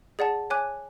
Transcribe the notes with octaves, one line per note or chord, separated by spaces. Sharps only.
G#4 D5 F#5 A5
C#5 G#5 D6 F#6